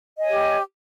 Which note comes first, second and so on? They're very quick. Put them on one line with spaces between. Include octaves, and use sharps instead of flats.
D#5 G#5 C#5 G4